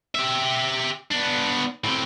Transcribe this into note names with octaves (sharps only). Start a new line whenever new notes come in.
G4 E5
B3 D4
A2 C4